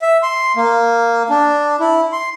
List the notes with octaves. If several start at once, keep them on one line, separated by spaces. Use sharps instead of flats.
E5
C6
A#3
D4
E4
C6